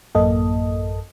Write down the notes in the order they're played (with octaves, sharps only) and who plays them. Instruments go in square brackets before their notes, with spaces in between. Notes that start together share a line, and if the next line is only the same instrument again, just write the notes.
[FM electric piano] A1 F#2 A#3 A4 D#5